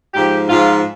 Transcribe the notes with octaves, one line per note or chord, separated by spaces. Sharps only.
G#2 F3 G4
G#2 F3 F4